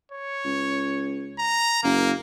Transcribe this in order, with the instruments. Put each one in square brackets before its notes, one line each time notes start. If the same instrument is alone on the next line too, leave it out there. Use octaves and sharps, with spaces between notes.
[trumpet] C#5
[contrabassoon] C#2
[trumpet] A#5
[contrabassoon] F#1 [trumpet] A#3